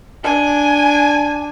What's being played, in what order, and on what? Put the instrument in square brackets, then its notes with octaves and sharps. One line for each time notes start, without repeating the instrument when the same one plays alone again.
[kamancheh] D4 G#5